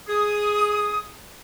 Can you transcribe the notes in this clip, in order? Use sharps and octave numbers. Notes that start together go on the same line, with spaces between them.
G#4 D#6